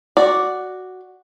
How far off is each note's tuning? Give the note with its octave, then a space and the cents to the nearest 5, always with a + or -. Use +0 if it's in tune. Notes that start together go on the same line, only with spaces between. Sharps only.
F#4 +0 D5 +0